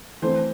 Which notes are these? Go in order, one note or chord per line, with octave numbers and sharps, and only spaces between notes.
E3 A3 C4 C5